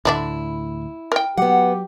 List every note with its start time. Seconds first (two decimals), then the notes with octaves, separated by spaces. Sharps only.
0.05 D2 A2 D3 D4 E4 E5
1.12 A#4 G5
1.37 F#3 B3 G4 F#5